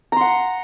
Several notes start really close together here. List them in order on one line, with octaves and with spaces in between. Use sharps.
A#5 C6 F#5